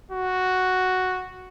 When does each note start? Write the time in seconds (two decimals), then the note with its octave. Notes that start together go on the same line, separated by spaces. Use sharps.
0.11 F#4